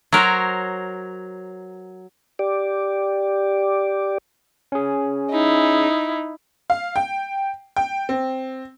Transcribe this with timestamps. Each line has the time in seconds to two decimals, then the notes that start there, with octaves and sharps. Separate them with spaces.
0.12 F#3 A#4 C5 C#5
2.39 G4 D5
4.72 C#4 G#4
5.31 D#4 E4
6.70 F5
6.96 G5
7.76 G5
8.09 C4